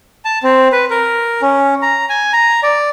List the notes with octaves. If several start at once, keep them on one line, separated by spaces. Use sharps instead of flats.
A5
C4
B4
A#4
C#4
A#5
G#5
A#5
D5